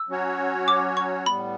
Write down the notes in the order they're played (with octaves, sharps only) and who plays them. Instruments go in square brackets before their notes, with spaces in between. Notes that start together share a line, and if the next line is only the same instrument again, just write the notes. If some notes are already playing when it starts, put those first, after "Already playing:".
Already playing: [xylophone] E6
[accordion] F#3 C#4 F#4 C#5
[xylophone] D6
C#6
[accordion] A2 G3 B3 [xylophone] B5